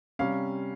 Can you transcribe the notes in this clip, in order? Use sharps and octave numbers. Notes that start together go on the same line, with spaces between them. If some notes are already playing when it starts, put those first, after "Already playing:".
C3 G3 C#4 F5